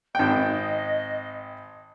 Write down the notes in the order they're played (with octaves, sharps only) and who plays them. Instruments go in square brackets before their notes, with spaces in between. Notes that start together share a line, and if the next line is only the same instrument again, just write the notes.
[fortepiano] G#1 G5 [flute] D#5